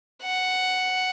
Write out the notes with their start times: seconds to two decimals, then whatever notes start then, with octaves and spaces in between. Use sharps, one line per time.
0.23 F#5